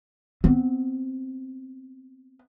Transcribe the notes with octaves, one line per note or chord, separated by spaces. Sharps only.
B3 C4